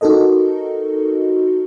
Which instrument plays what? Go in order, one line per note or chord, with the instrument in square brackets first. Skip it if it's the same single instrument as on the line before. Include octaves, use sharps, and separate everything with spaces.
[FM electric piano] D#4 F#4 A4 A#4 D#5